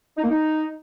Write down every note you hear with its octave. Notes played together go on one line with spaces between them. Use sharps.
D#4
A#3
D#4